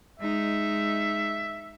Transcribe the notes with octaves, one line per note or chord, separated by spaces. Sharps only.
G#3 D#4 E5